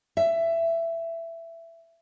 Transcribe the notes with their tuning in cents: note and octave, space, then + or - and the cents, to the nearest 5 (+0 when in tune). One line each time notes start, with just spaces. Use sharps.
E5 +15